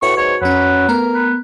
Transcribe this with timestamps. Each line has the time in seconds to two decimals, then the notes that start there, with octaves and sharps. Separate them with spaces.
0.02 A2 F#4 B4 C#6
0.17 G#2 C#5
0.42 F2 F#3 C#4 B4
0.89 A3 B3 A#4
1.15 B4